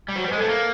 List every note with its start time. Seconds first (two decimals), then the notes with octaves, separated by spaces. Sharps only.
0.08 G3
0.16 F#3 C5
0.24 G3
0.28 G#3 B4
0.38 A4
0.42 A3
0.49 A#3 A4